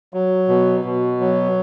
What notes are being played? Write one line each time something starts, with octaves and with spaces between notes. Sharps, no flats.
F#3
B2
B2
F#3